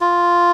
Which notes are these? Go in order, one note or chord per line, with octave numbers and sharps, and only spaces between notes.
F4